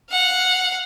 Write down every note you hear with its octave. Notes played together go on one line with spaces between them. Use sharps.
F5 F#5